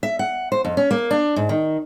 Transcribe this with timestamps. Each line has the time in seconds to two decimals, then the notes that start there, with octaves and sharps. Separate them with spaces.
0.03 E5
0.19 F#5
0.52 C5
0.65 F2
0.77 C#4
0.91 A#3
1.11 D4
1.36 G#2
1.49 D#3